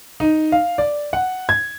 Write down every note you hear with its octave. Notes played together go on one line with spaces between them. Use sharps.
D#4
F5
D5
F#5
G#6